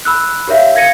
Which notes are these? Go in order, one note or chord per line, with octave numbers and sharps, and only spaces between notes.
B5 E6 F#6
G4 A#4 C#5 E5 F5
F5 G#6 A#6 C#7 D#7